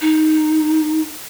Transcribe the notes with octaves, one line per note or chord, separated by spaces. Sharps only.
D#4